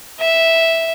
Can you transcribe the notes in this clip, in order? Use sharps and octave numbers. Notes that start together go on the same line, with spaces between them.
E5